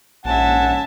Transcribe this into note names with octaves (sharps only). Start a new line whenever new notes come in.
A#1 G#2 C#4 E5 F#5 G#5 A5